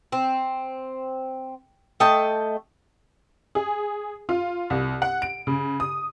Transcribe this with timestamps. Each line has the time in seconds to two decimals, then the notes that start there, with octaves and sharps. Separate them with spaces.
0.12 C4
2.00 A3 D#5 G5 A5
3.55 G#4
4.29 F4
4.70 C2
5.02 F#5
5.22 D7
5.47 C#3
5.80 D#6